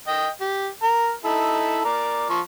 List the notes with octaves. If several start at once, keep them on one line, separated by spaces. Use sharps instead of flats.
D#5 G5
G4
A#4
D#4 E4 A4
A#4 D5
F3 C#6